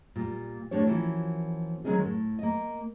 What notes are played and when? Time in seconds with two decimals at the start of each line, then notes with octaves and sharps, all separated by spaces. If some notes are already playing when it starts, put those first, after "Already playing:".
0.16 A#2 G3
0.71 A2 A3 D4 G4 C#5
0.87 E3 F3 A#3 C#4 E4 F#4
1.84 D#3 F#3 G#3 C#4 D#4 G#4
2.05 A2
2.39 A#3 D#5